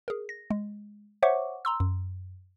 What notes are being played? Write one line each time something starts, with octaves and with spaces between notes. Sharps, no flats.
G#4 A#4
A#6
G#3
C5 C#5 E5 F#5 C#6 D6
A#5 C6 E6
F#2